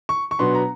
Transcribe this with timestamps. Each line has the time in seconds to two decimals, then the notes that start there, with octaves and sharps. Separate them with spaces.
0.09 C#6
0.31 C#6
0.39 B2 F#3 B3 D4 C6
0.55 A#5